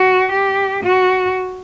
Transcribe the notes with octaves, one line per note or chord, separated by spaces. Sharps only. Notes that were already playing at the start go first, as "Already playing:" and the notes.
Already playing: F#4
G4
F#4